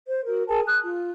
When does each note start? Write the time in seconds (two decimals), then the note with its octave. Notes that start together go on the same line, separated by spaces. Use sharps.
0.08 C5
0.26 F#4 A#4
0.48 G#4 A#4 G#5 A5
0.67 D#6 F#6
0.83 F4